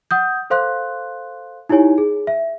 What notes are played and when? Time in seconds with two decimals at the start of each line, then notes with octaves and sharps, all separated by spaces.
0.11 F#5 D#6 G6
0.50 A4 C5 F5 C6 F#6
1.69 D#4 E4 G4 C#5 G#5
1.98 G#4
2.27 E5